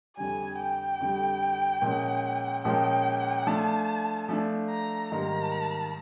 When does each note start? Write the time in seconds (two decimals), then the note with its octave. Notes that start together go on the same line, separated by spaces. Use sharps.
0.17 F2 D3 G3 G#5
0.59 G5
1.00 F2 D3 G3
1.82 A#2 F3 G#3 C#4
2.65 A#2 F3 G#3 C#4 G5
3.47 F3 A3 D4 A5
4.29 F3 A3 D4
4.70 A#5
5.11 G#2 D#3 G3 A#3 A#5